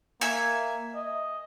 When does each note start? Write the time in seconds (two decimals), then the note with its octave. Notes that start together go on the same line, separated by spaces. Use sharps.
0.21 A#3 E5 G#5
0.94 D#5